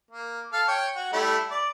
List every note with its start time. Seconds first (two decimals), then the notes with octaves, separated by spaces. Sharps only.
0.11 A#3
0.53 A4 F5
0.68 C#5 G5
0.96 F#4
1.13 G3 A3 E4
1.51 D5